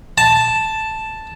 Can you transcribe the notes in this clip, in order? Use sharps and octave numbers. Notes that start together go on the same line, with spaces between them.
A5